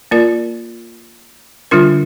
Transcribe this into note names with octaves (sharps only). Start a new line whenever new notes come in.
A#3 F4 A#4 D5
D3 G3 D4 F4 A#4